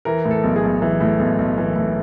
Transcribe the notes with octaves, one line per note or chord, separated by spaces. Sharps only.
E3 A#4
A2
A4
B1
G#4
B1
E3
A2
B1
B1
E3
A2